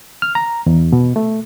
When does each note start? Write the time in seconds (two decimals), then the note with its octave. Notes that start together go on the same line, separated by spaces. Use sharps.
0.22 F6
0.35 A#5
0.66 E2
0.92 B2
1.16 A3